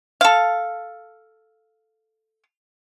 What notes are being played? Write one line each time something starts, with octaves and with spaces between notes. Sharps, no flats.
A4 F5